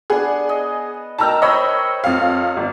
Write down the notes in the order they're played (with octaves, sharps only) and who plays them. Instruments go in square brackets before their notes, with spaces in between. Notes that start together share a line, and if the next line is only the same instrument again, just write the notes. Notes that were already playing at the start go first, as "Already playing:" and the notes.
[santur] B3 D4 [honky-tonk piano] G#4
[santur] D#5
[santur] D#4 A#4 G5 [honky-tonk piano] A5 A#5 E6
[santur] C5 C#5 E6 [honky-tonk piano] D#5 B5
[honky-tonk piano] F2 F5
G1